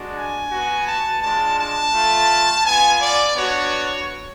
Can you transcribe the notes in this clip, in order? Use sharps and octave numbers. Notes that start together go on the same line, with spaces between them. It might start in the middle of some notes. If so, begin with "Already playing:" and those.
Already playing: G#3 D4 F#4
G#5
B3 F#4
A5
G#3 D4 F4 A5
A5
A3 F4
B3 F4 G#5
D5
B3 D4 F#4 C#5